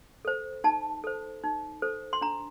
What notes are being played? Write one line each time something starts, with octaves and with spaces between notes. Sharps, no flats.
A4 C5
D#4 A5
A4 C5
D#4
A4 C5
C6
D4 A#5